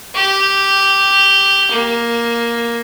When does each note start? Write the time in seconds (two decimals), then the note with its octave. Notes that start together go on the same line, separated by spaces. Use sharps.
0.15 G4
1.71 A#3